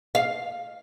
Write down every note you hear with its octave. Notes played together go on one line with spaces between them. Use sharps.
F5